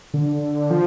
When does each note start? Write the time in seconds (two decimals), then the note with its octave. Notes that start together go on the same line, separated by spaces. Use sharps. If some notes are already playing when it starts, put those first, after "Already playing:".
0.14 D3
0.70 F3